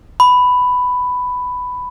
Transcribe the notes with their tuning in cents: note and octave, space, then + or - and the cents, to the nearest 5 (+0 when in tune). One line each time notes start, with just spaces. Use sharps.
B5 +10